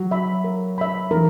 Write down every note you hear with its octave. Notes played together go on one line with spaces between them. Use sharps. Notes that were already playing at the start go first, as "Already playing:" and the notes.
Already playing: F#3
E5 B5
A#4
E5 B5
E3 A#4